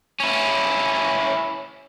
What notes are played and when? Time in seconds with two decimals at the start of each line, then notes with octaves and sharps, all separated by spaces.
0.20 C#4 E4